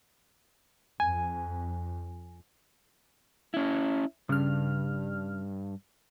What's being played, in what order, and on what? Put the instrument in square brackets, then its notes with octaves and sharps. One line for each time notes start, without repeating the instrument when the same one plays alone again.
[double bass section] F2 [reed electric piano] G#5
[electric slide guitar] C#4 E4
[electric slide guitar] G2 [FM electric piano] C#3 F6